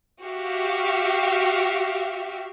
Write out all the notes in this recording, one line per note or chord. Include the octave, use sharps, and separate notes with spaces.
F#4 G4 E5 F5